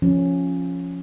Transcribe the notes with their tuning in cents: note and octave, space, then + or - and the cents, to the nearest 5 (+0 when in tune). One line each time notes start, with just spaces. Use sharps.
F3 +0 C#4 -5